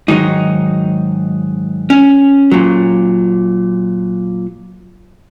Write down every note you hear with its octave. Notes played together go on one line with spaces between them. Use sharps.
G#2 D#3 F#3 D#4
C#4
A#2 F#3